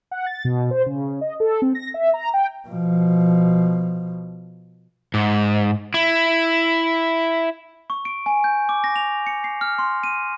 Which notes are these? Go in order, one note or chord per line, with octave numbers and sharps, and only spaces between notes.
F#5
A6
B2
C5
C#3
D#5
A4
C4
A#6
E5
A#5
G5
B2 F3
G#2
E4
C#6
D7
G#5
G6
D6
A#6
F7
C#7
C7
F6
C6
D#7